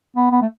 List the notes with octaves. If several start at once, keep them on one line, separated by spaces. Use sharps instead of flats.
B3
B3
A3